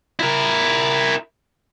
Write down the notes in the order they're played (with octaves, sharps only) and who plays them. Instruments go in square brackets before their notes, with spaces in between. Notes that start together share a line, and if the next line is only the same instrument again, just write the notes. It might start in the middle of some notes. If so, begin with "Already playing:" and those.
[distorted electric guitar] E4 A#4